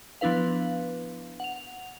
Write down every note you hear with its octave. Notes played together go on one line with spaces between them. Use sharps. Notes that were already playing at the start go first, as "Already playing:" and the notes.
F3 B3 D4 E4 B4 F5
F#5 F7